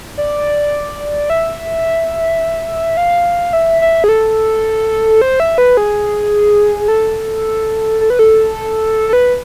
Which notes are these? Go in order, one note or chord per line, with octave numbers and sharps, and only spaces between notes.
D5
E5
F5
E5
E5
G#4
A4
C5
E5
B4
G#4
A4
A4
B4
A4
A4
B4